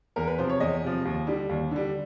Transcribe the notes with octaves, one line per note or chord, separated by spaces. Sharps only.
E2 A#4
B4
C3 F3 C5
C#5
E2 D#5
C3 F3
D#2
D3 G3
D#2
D3 G3